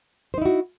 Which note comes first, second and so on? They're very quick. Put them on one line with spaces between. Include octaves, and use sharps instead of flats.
C5 D#4 E4 F#4